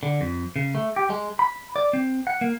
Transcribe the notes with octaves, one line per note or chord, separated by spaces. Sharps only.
D3
F2
C#3
A3
G4
G#3
B5
D5
C4
F#5
A#3